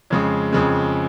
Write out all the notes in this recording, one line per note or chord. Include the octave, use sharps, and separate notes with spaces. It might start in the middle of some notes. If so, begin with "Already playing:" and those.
F2 C#3 G#3
F2 C#3 G#3